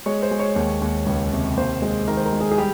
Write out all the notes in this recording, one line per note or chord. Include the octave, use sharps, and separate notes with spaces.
G#3 C#5
C5
G#3
C#5
D#2
D#2
C#2
C3
D#2 C5
G#3 C5
D#3 A#4
C5
A#4
G#3
G#4
G#4
G3 G4